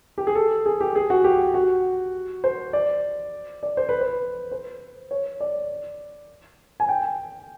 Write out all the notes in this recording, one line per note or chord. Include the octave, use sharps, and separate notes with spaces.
G4
G#4
A4
G#4
G4
G#4
F#4
G4
F#4
C5
D5
D5
C5
B4
C5
C5
C#5
D5
G#5
G5